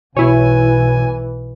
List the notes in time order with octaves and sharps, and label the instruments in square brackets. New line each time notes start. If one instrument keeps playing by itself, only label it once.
[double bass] B1 E3 [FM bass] B2 [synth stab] E4 C#5 [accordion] G#5